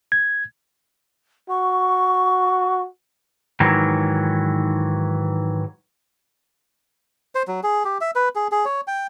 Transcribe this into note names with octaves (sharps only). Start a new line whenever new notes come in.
G#6
F#4 C#6
G#2 D#3 E3 F#3
C5
F#3
G#4
G4
E5
B4
G#4
G#4
C#5
G5